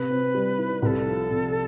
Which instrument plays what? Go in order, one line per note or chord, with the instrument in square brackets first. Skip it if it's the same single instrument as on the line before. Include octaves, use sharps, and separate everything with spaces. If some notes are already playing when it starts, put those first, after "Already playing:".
Already playing: [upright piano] C3 [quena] B4
[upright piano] C4
G3
E4
[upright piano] C2 [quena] A4 B4
[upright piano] F3
C3